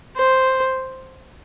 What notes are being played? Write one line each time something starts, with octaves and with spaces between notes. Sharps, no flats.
C5